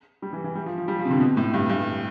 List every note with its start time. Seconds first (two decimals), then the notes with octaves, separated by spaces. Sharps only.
0.22 G3
0.33 E3
0.44 E3
0.55 G3
0.66 F3
0.78 F3
0.88 G3
0.99 F3
1.05 C3
1.11 D3
1.20 B2
1.37 A2
1.54 G2
1.70 G2